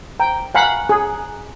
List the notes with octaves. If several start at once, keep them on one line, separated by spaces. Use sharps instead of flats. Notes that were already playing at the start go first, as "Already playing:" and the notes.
G5 A#5
F5 F#5 G#5 A#5 B5 F#6
G#4